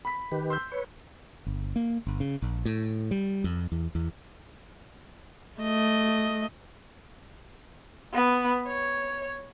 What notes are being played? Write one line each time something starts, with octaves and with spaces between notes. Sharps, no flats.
B5 B6
D#3 G4 B4
C6 E6 G6
B4 C#5
G1
A#3
G1
C#3
A#1
A2
G3
F2
E2
E2
A3 D#5
B3
C#5